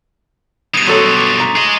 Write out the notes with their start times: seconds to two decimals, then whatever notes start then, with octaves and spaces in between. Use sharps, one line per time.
0.74 G2 B2 D#6 D#7
0.87 F#3 A4 C#5 C6 C#6 A6
1.17 D6
1.40 A#5
1.56 G#4 D#5